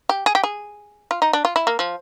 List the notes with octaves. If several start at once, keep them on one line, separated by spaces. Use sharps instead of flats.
G4
G#4
G4
G#4
F4
D#4
D4
F4
E4
A#3
F3